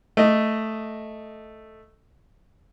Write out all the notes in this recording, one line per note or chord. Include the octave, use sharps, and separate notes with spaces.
A3 D#5